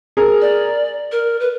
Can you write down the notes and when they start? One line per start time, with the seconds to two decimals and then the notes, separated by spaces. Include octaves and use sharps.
0.17 G#4 A#4
0.41 D5
1.12 A#4
1.40 B4